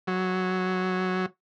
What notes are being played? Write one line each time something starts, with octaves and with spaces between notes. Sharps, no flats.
F#3